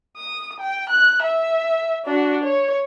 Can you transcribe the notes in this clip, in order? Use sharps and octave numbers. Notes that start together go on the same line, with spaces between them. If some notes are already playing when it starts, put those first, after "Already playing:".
D#6
G5
F#6
E5
D4 F#4
C#5